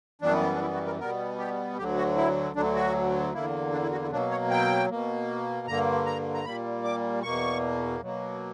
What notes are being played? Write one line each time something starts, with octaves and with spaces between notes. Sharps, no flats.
F#2 E3 G3 B3 D4
D4
E4
F#4
A#4
B2 G3 B3 A#4
G4
D2 D3 F#3 G4
F#4
E4
D2 D3 F#3 D4
F#4
E2 D3 A#3 E4
D4
E4
F#4
E4
B2 F#3 A#3 D4
C#5
G5
B2 A#3
G2 D3 A#3 A#5
A#5
A#5
A#2 G3 A#3 B5
D6
E2 B2 A#3 C#6
B2 F#3 A#3